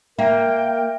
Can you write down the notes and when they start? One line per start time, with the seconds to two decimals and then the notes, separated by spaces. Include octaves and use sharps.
0.19 A#3 A#4 E5 G5